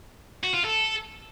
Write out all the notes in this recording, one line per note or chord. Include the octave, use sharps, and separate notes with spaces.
F#4
F4
A4